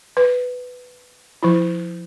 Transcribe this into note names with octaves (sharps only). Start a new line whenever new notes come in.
B4
F3 E4